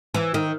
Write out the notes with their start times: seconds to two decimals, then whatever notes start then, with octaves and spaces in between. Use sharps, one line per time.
0.14 E3
0.34 D#3